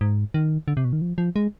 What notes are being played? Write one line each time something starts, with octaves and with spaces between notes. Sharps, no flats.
G#2
D#3
D3
C3
B2
D#3
F3
F3
G#3